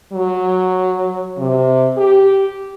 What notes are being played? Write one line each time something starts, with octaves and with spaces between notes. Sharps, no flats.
F#3
C3
G4